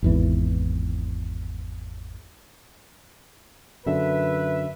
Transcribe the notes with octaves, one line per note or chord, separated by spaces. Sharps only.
G#1 E2 E3
F#2 D3 B4 E5